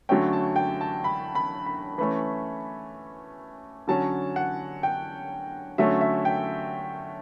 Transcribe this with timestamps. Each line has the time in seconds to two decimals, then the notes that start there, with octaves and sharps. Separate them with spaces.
0.09 D3 F#3 A3 C#4 G5
0.33 A5
0.56 G5
0.81 A5
1.04 B5
1.35 B5
1.66 B5
1.98 E3 A3 C#4 B5
3.88 D3 F#3 C#4 A5
4.36 F#5
4.83 G5
5.78 D3 F#3 A3 C#4 E5
6.01 E5
6.25 G5